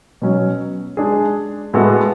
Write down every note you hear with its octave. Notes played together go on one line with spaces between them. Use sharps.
B2 F#3 C#4
G#3 D4 G#4
A2 G#3 B3 F#4 A4